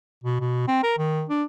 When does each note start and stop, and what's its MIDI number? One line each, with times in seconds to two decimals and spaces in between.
0.24 0.38 47
0.40 0.64 47
0.68 0.81 60
0.83 0.94 70
0.98 1.24 51
1.30 1.43 62